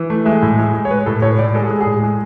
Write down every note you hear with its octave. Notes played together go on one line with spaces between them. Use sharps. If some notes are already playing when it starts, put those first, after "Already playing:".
Already playing: E3
A3
G#3 E5
A2
G#3
G#3
C#5
G#3 B4
A2 A4
A2 C#5
A2 D5
G#3 A4
G#4
G#3
G#4
A2
G#3